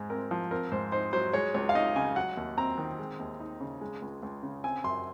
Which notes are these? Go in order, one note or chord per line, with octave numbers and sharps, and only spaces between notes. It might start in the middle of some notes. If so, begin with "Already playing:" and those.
Already playing: G#2 G#3
C4 A#4
F3
C4 A#4
G#2 C5
D#4 C5
F#3 C5
G#3 C#5
C#2 C#5
F5
D#4 D#5
C#3 G#5
F#3 F#5
D#2
C4 A#5
D#3
G#3
D#2
D#4
C#3
G#3
C#2
C#2
C#3
C4 G#5
F#2 C6